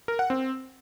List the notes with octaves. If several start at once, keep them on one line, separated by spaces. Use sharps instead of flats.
A#4
F#5
C4